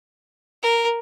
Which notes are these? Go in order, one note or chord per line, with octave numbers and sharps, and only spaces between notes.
A#4